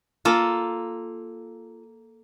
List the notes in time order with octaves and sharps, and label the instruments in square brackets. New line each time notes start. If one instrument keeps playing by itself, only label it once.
[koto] A#3 A4 [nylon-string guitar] F4